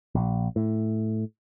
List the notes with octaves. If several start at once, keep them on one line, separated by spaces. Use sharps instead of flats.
A#1
A2